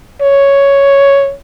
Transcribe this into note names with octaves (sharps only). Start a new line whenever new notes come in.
C#5